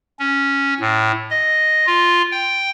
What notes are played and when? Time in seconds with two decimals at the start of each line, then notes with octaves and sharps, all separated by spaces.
0.19 C#4
0.80 A2
1.30 D#5
1.87 F4
2.31 G5